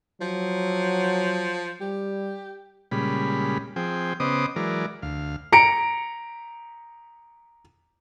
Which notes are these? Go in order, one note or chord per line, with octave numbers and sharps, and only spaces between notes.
F3 F#3
G3 G4
A#2 C#3 G3 G#3 B5
F3 C4 G#4 G5
C#3 B3 C5 D#5 D6 D#6
E3 F#3 G#3 A#4 D5
D2 F5
A#5 C#7 D7